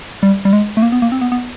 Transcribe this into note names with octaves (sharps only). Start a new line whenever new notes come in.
G3
G3
G#3
A3
A#3
B3
A#3
C4
B3
B3